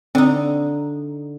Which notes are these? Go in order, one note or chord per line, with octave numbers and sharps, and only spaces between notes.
D3 C4 D#4